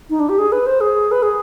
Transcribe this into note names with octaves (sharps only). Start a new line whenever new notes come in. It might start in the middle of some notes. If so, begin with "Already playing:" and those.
D#4
D4
G4
G#4
B4
C5
G#4
B4
G#4